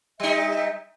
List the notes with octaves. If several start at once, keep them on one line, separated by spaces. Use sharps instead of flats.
G3 D#4 E5